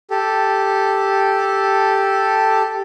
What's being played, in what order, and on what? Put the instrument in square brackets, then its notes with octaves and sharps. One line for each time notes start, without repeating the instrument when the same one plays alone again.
[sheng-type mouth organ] G4 A4